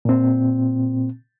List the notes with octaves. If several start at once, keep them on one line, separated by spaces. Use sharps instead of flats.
A#2 C4